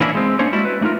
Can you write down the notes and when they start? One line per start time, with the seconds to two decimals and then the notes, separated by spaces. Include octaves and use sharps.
0.01 E3 A#3 C#4 D4 E4
0.15 G#3 C4
0.39 A#3 C#4 D4 C5 C#5
0.52 G3 G#3 E4 F#4
0.65 B4
0.81 A3 D4 D#4 F4 A#4